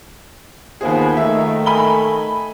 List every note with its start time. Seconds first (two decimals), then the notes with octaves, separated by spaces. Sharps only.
0.81 D#2 A#3 B3 F4 G#4 C5
1.17 D#3 A3 E5
1.66 G#5 B5 G7